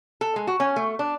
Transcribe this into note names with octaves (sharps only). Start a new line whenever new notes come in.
A4
G#3
F#4
C#4
A3
D4